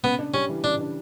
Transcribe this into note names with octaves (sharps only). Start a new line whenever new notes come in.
C#3 B3
D4
G3 C#4
E3
C#3 D4
D4